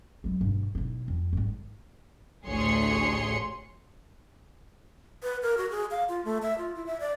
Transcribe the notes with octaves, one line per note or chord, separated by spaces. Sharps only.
F#3 G#3
G2 B2
B1 E4
F2
G#1 G3
A1 D2 G#4 C#5 C6 C#7
B4
A#4
F#4
G#4
F5
F4
A3
E5
F4
E4
E5
D5